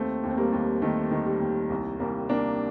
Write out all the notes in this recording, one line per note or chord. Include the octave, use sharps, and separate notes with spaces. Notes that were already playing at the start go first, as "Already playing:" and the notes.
Already playing: D#2 A3 C4
D#2
C4
G3 A#3
D#2
D#3 A3
D#3
G3
D#2
C2
C2 G3 A#3
C3 A#3 D4